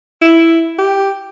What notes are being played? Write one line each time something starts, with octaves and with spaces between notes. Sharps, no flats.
E4
G4